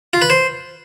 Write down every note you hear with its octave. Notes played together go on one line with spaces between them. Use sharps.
F4
B4
C5